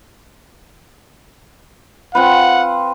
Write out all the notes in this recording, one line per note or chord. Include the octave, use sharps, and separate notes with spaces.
C4 F4 B4 F#5